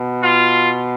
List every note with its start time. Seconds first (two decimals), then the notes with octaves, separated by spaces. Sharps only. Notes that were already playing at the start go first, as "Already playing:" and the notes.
Already playing: B2
0.21 F4